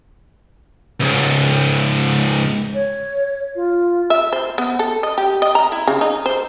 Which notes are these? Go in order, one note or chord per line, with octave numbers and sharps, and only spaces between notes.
C#2 G#2
C#5
F4
E5
C5
B3
A4
D#5
G4
D#5
A#5
E4
C#3
D#4
C5